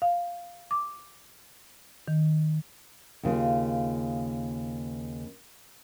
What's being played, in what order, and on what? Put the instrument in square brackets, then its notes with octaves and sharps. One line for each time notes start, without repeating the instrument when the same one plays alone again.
[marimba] F5
D6
D#3
[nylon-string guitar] D#2 C#3 F4